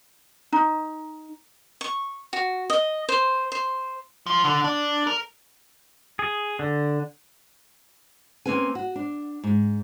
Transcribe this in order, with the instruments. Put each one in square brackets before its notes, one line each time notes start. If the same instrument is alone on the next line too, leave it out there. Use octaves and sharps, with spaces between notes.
[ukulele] D#4
[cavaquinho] C#6
F#4
D#5
C5
C5
[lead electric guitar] F3
D3
D4
A#4
[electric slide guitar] G#4
D3
[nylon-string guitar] A#3 C4 C#4 B4 G#5
F#4
D4
G#2